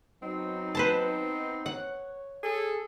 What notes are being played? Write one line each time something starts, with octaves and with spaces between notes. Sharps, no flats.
F#3 B3 C4 D#4
B4 C5 A5
C#5 F#5
G#4 A4